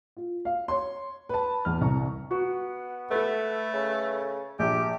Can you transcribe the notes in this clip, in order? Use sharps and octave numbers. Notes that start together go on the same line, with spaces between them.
F4
F5
C#5 C6
B4 A5
E2 F6
C2 A#5 C#6
B3 F#4
A3 A4 B4
C#3
A#1 G4